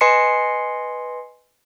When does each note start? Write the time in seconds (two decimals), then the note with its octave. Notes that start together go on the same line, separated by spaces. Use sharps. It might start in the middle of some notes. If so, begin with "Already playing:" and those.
0.01 B4 D#5 G#5 C6 C7 C#7